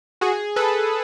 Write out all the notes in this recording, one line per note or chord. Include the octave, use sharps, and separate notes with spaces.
F#4 G#4
A4 B4